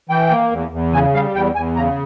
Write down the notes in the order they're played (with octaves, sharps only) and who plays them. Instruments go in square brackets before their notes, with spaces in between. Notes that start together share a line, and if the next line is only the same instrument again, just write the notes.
[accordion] E3 G5
A#3
E2
E2
C#3 G#5
G3 F5
E2 G5
E2 G#5
C#3 A#5